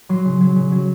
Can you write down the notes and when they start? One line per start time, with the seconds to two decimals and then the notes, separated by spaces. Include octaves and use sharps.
0.09 F#3 C6
0.25 C#3
0.40 F#3
0.56 C#3
0.72 F#3